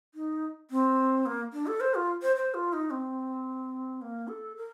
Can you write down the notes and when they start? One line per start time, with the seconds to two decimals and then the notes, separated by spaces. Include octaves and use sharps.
0.14 D#4
0.71 C4
1.26 A#3
1.53 D4
1.67 A4
1.80 C5
1.94 F4
2.22 C5
2.36 C5
2.54 F4
2.73 D#4
2.90 C4
4.01 A#3
4.28 A4
4.56 A#4